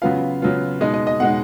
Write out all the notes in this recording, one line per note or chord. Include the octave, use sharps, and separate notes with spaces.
C#3 F#3 B3 F4 F5
C#3 F#3 B3 F4
B2 G#3 D#4 D#5
D#5
D#5
B2 G#3 D#4 F#5